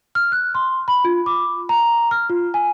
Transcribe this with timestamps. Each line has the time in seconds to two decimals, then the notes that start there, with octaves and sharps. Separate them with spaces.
0.15 F6
0.32 F#6
0.55 C6
0.88 B5
1.05 F4
1.26 D6
1.69 A#5
2.11 F6
2.29 F4
2.54 G#5